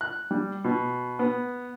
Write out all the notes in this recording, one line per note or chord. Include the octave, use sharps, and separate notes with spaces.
F#6
G3
B2
B3